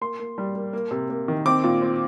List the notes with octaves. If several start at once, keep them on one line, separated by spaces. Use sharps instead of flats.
A#3 C6
A#3
G3
A#3
A#3
C3
A#3
D#3
C4 D6
A#2
C4